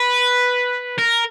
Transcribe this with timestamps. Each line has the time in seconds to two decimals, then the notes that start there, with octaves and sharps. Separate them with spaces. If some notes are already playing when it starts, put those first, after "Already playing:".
Already playing: B4
0.98 A#4